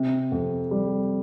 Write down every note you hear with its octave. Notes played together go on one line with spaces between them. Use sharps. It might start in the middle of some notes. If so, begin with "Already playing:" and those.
Already playing: C3
F2
G3